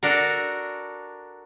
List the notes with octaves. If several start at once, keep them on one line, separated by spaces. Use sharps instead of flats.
D4 F#4 A4 A#4